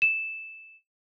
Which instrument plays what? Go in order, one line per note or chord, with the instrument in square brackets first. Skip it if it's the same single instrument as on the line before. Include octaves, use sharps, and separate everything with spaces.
[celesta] E7